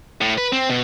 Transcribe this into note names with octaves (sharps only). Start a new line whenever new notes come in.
A2
B4
C4
B2